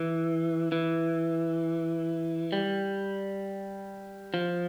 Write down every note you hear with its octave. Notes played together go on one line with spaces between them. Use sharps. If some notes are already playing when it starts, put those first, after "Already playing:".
Already playing: E3
E3
G3
F3